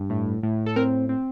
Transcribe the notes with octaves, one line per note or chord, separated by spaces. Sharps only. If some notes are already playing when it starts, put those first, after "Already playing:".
Already playing: G2
A2
A2
A4
C4 A#4
C4